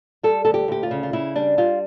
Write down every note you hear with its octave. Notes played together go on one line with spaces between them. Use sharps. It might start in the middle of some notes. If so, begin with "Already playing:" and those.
G3 A4
D2 A4
G4
D2 G4
F4
C#3
F4
C#3 E4
G3 D4
G3 F4